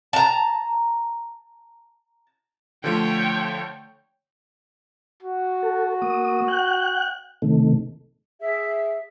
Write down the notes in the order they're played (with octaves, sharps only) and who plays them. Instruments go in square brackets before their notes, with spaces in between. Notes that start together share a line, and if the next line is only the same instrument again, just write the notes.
[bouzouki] A5 A#5
[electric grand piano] D3 F3 A3 [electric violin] C#5 G5
[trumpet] F#4
[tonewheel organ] A4
A#3 D#6
F#5 G5 F#6
C3 D#3 A3
[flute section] G#4 E5